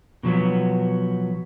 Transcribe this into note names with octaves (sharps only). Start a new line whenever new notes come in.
B2 F3 F#3 B3